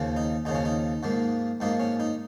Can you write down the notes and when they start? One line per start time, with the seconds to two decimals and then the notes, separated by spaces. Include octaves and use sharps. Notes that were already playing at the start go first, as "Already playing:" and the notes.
Already playing: D#2 C#3 F3
0.16 D#4
0.45 D#2 C#3 F3 D#4
0.55 C#4
0.65 D#4
1.03 G#2 F3 A#3
1.60 G#2 F3 A#3 D#4
1.80 C#4
2.00 D#4